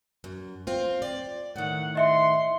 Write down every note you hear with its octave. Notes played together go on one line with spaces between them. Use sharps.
F#2
C4 F4
D5
A2 D#3 F#5
D#5 E5 C6 C#7